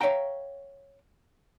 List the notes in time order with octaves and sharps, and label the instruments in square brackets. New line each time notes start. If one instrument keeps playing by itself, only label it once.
[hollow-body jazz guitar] C#5 D5 E5 F5 G5 A#5